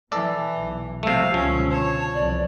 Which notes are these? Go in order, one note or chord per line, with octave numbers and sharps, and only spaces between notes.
B2 E3 A4 D5
B1
F2 C3 G3 A3 F5 E6
C#2 B2 D3 F3 C#4
C#5 A5
C2 F2 E3 D5